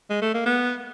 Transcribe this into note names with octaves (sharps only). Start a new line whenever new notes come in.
G#3
A3
A#3
B3